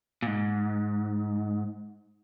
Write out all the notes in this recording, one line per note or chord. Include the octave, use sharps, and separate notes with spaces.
A#2
G#2